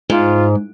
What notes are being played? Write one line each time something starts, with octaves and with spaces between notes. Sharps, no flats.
G#2 F4